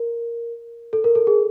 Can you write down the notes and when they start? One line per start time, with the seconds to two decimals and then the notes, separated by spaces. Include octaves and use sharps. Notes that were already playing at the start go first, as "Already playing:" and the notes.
Already playing: A#4
0.93 A4
1.04 A#4
1.15 A4
1.27 G#4